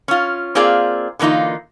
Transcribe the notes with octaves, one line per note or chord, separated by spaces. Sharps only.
C#4 F4
A#3 C4 F4 G#4 D5
D3 E3 A#3 D#4 F4